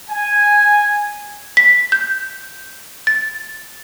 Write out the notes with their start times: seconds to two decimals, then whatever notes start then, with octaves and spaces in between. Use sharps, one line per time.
0.10 G#5
1.57 B6
1.92 G6
3.07 A6